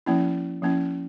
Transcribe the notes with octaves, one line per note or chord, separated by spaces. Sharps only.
F3 A#3 C#4 E4
F3 A#3 C#4 E4